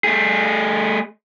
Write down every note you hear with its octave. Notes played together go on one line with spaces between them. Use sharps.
A3 G#4